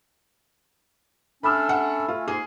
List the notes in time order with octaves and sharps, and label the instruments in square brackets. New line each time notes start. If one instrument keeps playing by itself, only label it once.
[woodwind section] A3 C#4 D4 [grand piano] B5 E6 F6
[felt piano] F#5
[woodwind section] A3 C#4 [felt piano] F4
[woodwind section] G#2 A#3 C6 [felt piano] G#4